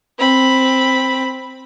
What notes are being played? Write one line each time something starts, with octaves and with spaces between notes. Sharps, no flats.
C4 B5